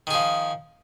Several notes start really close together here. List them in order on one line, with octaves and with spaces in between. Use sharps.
D#3 G#4 F3